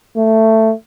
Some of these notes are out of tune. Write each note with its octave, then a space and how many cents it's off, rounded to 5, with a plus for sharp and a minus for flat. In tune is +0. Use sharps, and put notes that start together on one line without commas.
A3 +10